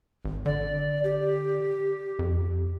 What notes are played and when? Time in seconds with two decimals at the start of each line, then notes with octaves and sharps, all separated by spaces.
0.25 G#1
0.46 D3 D5
1.04 G4
2.19 F2